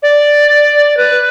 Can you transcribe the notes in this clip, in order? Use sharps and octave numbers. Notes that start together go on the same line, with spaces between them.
D5
B4